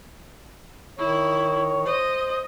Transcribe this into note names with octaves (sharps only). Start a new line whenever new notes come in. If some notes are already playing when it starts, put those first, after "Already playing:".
D#3 E4 C#5
C5 D#5